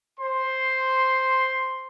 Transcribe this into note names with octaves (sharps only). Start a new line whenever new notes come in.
C5 C6